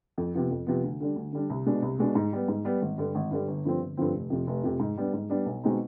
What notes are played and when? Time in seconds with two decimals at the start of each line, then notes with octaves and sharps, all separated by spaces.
0.18 F2
0.34 C3 F3 B3
0.51 F2
0.67 C3 F3 B3
0.84 D2
1.00 D3 G3 D4
1.16 D2
1.33 D3 G3 D4
1.50 C2
1.66 B2 G#3 D4
1.82 C2
1.98 B2 G#3 D4
2.15 G#2
2.33 G3 B3
2.48 G#2
2.65 G3 B3
2.82 G#1
2.98 G2 D3 G3
3.15 G#1
3.31 G2 D3 G3
3.48 G1
3.65 G2 D3 F3 C4
3.81 G1
3.97 G2 D3 F3 C4
4.14 F1
4.30 F2 C3 F3
4.47 F1
4.63 F2 C3 F3
4.80 G#2
4.97 G3 B3 D4
5.13 G#2
5.30 G3 B3 D4
5.46 B1
5.64 B2 G#3 C4 D#4